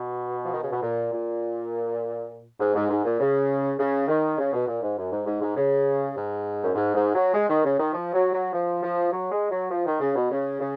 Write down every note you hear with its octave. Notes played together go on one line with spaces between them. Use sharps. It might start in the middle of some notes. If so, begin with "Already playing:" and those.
Already playing: B2
F3
D#3
C#3
B2
A#2
A#2
G#2
G#2
G#2
A#2
C#3
C#3
D#3
C#3
B2
A#2
G#2
F#2
G#2
G#2
G#2
C#3
G#2
F#2
G#2
G#2
F#3
G#3
D#3
C#3
D#3
F3
F#3
F#3
F3
F3
F#3
G#3
F#3
F3
D#3
C#3
B2
C#3
C#3